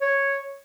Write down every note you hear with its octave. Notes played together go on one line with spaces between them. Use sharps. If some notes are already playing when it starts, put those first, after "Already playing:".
C#5